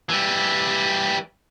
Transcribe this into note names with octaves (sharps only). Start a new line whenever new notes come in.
E3 G3